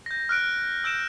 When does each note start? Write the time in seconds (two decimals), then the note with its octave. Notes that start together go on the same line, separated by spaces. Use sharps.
0.06 G6 A#6
0.29 F6 F#6 D7
0.84 E6 G6 D7 E7